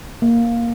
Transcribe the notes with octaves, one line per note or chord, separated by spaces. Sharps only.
A#3